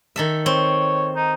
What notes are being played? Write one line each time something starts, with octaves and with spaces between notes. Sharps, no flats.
D#3 A4 E5
C4 C#5
D#4